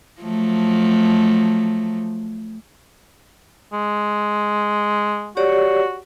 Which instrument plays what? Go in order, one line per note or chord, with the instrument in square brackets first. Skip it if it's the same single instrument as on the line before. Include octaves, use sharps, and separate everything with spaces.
[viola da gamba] F3 F#3 A3
[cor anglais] G#3
[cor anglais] F#4 [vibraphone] G4 C#5 D5